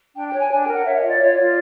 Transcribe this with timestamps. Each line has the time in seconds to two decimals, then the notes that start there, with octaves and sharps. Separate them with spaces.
0.15 D4 G5
0.26 G5
0.32 C#5
0.38 G#5
0.50 D4 G#5
0.61 G5
0.67 A#4
0.73 F#5
0.84 C#5 E5
0.96 D#5
1.01 F4
1.08 D5
1.19 F4 C#5
1.31 D5
1.36 F4
1.43 D5